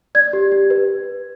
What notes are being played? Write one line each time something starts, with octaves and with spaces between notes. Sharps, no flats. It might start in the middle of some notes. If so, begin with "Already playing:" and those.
D5 G#6
G4
G4
B4